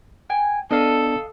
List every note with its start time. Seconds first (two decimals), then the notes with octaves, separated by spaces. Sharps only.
0.30 G5 G#5
0.71 B3 D4 A4 D5 D#5 F5